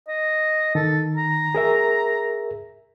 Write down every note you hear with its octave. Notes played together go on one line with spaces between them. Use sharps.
D#5
D#3 A4
A#5
G#4 A#4 E5